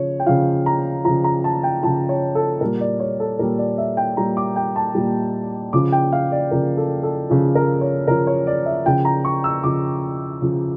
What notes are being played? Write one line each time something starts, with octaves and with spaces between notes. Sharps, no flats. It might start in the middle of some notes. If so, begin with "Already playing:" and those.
Already playing: C#3 F3 C#5
G5
C#3 F3 F5
A#5
C#3 F3 A#5
A#5
A5
G5
C#3 F3 A5
C#5
A4
A#2 G3 A#4
D5
C#5
A4
A#2 G3 A#4
D5
E5
G5
A#2 G3 A#5
D6
G5
A5
A#2 G3
C#3 F3 D6
G5
F5
D5
C#3 F3 A#4
A4
A4
C#3 F3
A#4
C#5
C#3 F3 A#4
C#5
D5
E5
C#3 F3 G5
A#5
C#6
E6
C#3 F3 D6
C#3 F3